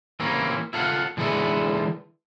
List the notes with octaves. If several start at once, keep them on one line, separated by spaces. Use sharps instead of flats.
E3 A#3 C4 C#4 E4
E4 F4 A4 A#4 F5 F#5
D3 E3 G#3 A4 B4 E5